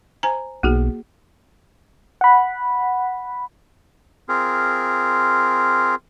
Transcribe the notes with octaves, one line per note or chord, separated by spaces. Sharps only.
C5 G#5 A#5
B1 A#3 F#4 G#4
F#5 B5
C4 F4 G#4 A#4